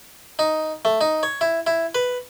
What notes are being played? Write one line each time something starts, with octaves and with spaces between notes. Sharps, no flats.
D#4
A3
D#4
C#5
E4
E4
B4